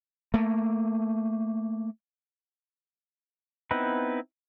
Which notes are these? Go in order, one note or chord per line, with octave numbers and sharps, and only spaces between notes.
A3 A#3
B3 C4 D#4 E4 B4